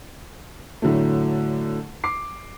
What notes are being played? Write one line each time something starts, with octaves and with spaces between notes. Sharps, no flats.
A2 D3 F#3 A3
D6 C7